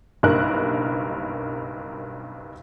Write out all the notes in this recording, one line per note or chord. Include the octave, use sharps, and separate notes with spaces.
F#1 B1 G2 A#4 F#6